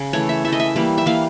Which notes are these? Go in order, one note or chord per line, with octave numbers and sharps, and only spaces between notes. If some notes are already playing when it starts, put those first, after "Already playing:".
Already playing: C#3
E3 A3 C#5
E5
E3 A3 E5
D#5
E5
E3 G3 A#3
E5
E3 G3 A#3 F5